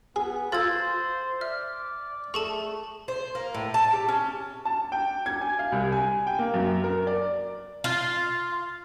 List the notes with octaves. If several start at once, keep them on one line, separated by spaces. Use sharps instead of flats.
B3 G#4
F4 A4 C5 A#5 E6 G#6 A6
D5 E5 F6
A3 G#4 A4 A5 C#6
C5
A#3
A2
A5
G4
C#4
A5
G5
G#6
G#5
F5
C2
G#5
G5
A#3
F#2
A#4
D5
F4